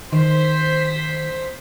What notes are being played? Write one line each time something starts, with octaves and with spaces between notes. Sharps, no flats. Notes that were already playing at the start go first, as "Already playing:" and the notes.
D#3 C5 B6